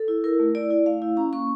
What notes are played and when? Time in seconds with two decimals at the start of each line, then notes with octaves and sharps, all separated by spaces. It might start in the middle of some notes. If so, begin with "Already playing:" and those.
Already playing: A4
0.08 E4
0.24 E4 A#4
0.40 A3
0.55 E4 D5
0.70 E4
0.86 A3 F5
1.02 E4
1.17 C#4 A#5
1.33 A#3 C#6